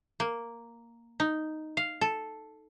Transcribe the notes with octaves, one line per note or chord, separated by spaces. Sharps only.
A#3
D#4
F5
A4